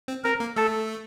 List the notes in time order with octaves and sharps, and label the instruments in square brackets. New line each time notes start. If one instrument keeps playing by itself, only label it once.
[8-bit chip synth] C4
[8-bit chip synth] C4 [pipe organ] A#4
[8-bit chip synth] A#3
[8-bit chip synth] A3 [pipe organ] A4